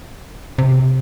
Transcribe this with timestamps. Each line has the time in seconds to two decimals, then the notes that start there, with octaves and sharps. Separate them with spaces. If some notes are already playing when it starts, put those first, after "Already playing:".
0.58 C3